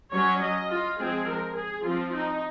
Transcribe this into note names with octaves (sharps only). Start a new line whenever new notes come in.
F#3 C#4 C#5
D#5
F4
F3 G#3 C4 G#4
A#4
G#4
F3 C4 F4
D#4